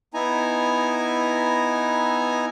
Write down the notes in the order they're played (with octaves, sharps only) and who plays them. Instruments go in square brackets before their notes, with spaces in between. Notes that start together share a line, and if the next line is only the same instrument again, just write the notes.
[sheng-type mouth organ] B3 D#4 E4 G#5 A#5